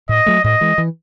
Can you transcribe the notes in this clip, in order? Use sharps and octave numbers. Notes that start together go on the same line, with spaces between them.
A2 D#5
F#3 A3
A2 D#5
E3 G#3
E3